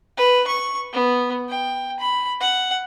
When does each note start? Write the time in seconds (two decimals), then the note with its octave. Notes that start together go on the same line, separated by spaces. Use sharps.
0.17 B4
0.47 C#6
0.93 B3
1.49 G5
1.99 B5
2.40 F#5